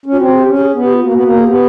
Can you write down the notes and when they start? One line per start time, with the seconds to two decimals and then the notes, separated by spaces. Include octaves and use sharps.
0.06 C#4
0.12 F4
0.17 C4 F#4
0.32 G#4
0.39 G4
0.46 C#4
0.55 G4
0.61 G#4
0.75 B3
0.82 G4
0.93 F4
1.04 A#3 F#4
1.14 B3
1.23 A#3
1.39 G#4
1.47 B3 G4